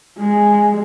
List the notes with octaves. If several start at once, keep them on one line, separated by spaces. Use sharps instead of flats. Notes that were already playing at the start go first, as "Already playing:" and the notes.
G#3